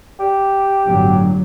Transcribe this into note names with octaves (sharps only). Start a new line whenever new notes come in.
G4
G1 A2 F#3